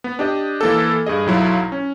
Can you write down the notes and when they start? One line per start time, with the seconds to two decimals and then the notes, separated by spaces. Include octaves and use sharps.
0.04 B3
0.19 D4 G4 D#5
0.61 E3 A#3 A4
1.06 G2 G#4 D#5
1.26 B1 F#3 E4 F4
1.72 C#4